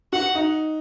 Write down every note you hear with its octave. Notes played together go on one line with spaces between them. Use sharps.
F#4 F#5
D#4